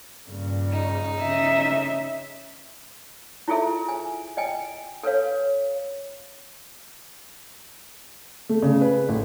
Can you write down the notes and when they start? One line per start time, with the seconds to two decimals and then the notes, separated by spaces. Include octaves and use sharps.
0.29 G2 A#2 C#3
0.72 D#4
1.21 C#3 D#5 E5
3.48 E4 F4 G#4 A4 E5
3.89 G#5
4.37 D#5 G5 G#5
5.03 A4 B4 C#5 F5
8.49 A3
8.63 C#3
8.81 B4
9.09 A1